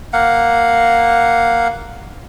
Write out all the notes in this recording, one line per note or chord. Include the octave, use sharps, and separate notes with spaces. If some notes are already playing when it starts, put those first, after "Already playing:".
A#3 F5 F#5